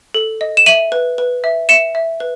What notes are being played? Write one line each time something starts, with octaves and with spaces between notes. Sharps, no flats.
A4
D#5
E7
E5 D#7 F#7
B4
B4
E5
E5 C#7 E7
E5
B4